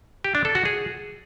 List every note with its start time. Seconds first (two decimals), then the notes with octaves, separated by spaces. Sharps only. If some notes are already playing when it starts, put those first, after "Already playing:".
0.24 G4
0.35 D4
0.45 A4
0.55 F#4
0.65 G#4